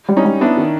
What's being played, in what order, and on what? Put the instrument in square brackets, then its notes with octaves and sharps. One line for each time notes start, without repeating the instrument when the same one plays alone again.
[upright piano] G3
[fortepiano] C#4 D#4
[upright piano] G3
[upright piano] B3 [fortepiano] D4 E4
[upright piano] D#3